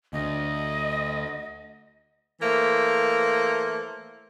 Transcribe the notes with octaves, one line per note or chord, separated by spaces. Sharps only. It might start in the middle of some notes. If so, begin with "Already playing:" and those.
D2 D#5
E3 A3 A#3 C5